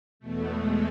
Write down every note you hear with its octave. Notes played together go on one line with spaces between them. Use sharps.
E2 B2 A3
G#3